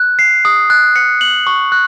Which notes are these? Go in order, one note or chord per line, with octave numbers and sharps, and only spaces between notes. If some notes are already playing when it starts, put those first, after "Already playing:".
Already playing: F#6
C7
D#6
F#6
C#7
F#7
C#6
F#6